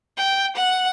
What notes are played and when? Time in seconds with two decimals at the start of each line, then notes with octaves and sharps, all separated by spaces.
0.18 G5
0.56 F#5